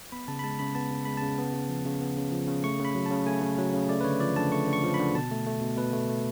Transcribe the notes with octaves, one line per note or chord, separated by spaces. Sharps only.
B3 B5
C#3 A5
B5
G#3 A5
C#3 B5
B3 A5
C#3
G#3 B5
C#3 A5
B3
C#3
F3
C#3
B3
C#3
F3
C#3
A3 C#6
C#3
B5
F#3
C#3 A5
A3 G#5
C#3
F#3
C#3
A3 D5
B4
D3 C#5
F3 D5
D3 A5
A3 C#6
D3 C#6
F3
B5
D3
B2 A5
A3
A3
B2
B2 B4
A3
A3